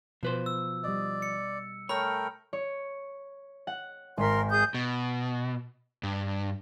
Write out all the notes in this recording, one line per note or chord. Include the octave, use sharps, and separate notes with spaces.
B2 F3 B4 C5
E6
G3 D5 D#5
C#7
A3 A#4 C#5 G5 B5 F6
C#5
F#5
G#1 A#4 C6 B6
G#4 D#6 G6
B2
G2